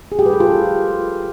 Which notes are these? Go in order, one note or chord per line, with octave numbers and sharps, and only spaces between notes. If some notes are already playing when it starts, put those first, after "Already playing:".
G#4
G4
B4
A4
F4